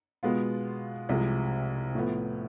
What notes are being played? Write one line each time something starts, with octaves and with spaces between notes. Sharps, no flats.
B2 G#3 B3 F4
C2 C3 F3 G#3
A2 F3 B3